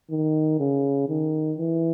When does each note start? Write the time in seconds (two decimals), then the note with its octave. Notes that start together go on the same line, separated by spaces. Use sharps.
0.10 D#3
0.60 C#3
1.09 D#3
1.58 E3